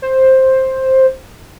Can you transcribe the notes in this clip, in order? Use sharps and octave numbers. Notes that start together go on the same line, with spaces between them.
C5